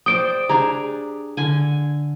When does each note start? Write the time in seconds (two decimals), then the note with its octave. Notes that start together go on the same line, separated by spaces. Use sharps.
0.06 C5 D5 G5 D#6 D7
0.49 D4 G4 G#4 A#5
1.37 D3 G#5